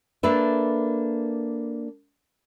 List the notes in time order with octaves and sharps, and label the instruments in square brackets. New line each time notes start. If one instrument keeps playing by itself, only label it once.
[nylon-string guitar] A#3 D4 A4 B4 E5